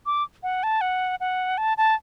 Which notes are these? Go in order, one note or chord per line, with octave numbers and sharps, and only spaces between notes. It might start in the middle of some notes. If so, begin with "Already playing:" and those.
D6
F#5
A5
F#5
F#5
A5
A5